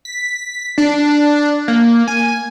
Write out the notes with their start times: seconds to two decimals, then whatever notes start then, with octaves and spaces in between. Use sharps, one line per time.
0.05 B6
0.78 D4
1.68 A#3
2.08 G#5